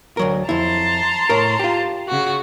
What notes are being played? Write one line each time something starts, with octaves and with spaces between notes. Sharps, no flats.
D2 F#3 A#4
F2 E4 A5 A#5 C6
A2 A#4
F4 G4
C#3 F#4